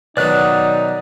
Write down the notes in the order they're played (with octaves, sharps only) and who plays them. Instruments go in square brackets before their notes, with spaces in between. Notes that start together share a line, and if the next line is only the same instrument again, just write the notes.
[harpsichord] B2 D#3 F#3 [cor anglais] D#4 [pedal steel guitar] D5 F#6